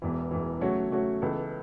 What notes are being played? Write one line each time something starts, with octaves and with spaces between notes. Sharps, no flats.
E1 E2 E3
E1 E2 E3
C#3 F#3 A3 F#4 C#5
C#3 F#3 A3 F#4 C#5
C#2 C#3 E3 B3 A4